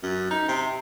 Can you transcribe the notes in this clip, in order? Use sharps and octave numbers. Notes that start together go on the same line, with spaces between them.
F#2
D#4
C3